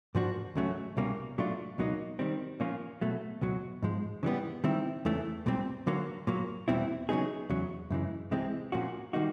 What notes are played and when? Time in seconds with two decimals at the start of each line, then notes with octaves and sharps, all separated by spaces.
0.15 G#2 F3 A#3 D4 F#4
0.55 C#2 C#3 F#3 A3 C#4
0.97 C2 B2 G3 A#3 C#4
1.38 A#2 F#3 A3 D4 F4
1.78 C#2 B2 F#3 A#3 D#4
2.19 D#3 G3 C4
2.60 A#2 F3 A#3 C#4 F4
3.01 B2 F#3 A3
3.41 C#2 B2 F#3
3.83 G#2 F3 G#3
4.23 C#3 E3 G3 B3
4.64 D#3 G3 C4 E4
5.05 E2 C#3 E3 A3
5.46 B1 A#2 G3 C4
5.87 D3 F#3 A#3
6.27 A#2 F#3 A#3
6.68 E2 B2 G3 C4 E4
7.09 C#3 F#3 B3 D#4 G#4
7.50 E2 C#3 F#3
7.90 F#2 C#3 E3 G#3
8.31 C2 C3 E3 G#3 C4
8.72 A#2 F3 A#3 C#4 F#4
9.13 D#3 G3 A#3 D#4 F#4